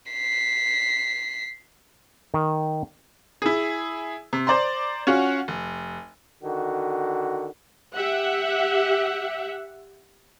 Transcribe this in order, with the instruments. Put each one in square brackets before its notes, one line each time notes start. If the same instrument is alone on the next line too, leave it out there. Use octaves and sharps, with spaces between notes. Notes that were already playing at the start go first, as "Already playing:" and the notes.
[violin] B6 C7
[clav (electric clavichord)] D#3
[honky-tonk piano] E4 G#4
C3
C5 D5 A#5 C6
C#4 F4 F#4 F#5
F1
[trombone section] D3 D#3 F#4
[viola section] G4 E5 F#5